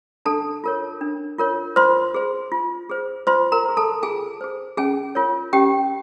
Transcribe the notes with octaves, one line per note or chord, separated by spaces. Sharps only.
D4 A4 A5
F4 A#4 C#5
D4
F4 A#4 C#5
F4 C5 C6
G#4 C5
F4
G#4 C5
F4 C5 C6
A#4 A#5
G#4 C5
A4 A5
F4 G#4 G#5
G#4 C5
C#4 G#4 G#5
F4 A#4 C#5
C#4 G4 G5